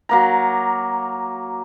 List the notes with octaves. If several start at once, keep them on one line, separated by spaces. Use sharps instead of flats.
F#3 A#3 A#5